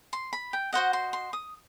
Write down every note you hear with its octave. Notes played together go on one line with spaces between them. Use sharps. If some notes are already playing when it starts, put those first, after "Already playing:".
C6
B5
G5
F#4 C5 D#5 F#5
C6
C6
D#6